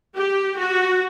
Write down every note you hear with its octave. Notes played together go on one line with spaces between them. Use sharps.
G4
F#4